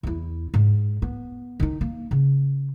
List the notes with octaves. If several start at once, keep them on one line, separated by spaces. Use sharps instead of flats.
E2 E4
G#2
B3
D#3 D#4
A#3
C#3